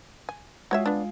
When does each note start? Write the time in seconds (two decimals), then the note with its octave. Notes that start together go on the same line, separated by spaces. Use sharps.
0.29 G#5
0.71 G#3 F4 F#4 C#5 E5
0.86 B3 D4